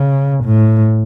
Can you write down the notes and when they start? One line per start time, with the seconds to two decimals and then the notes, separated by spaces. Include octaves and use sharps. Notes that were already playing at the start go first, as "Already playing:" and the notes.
Already playing: C#3
0.45 A2